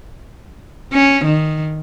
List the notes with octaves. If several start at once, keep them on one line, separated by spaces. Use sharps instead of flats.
C#4
D#3